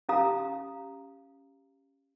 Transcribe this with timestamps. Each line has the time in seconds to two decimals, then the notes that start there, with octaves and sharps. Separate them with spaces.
0.09 C#4 G4 F5 A#5 D#6